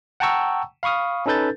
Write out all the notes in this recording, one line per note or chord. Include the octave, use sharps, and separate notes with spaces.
F#5 G5 A5 A#5 C#6 E6
F5 B5 C#6 D#6 F6
C#4 D#4 A4 B4 G6 A6